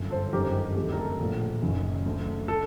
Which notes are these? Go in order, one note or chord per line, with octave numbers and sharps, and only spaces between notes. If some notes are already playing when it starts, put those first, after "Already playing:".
Already playing: G1 F#2 D3
A4 C5
G1 F#2 D#3 G4 A#4
A4
D2 C3 D#3 G4
A#4
A4
A#1 A2
F#1 F#2 D#3
D2 D3
A4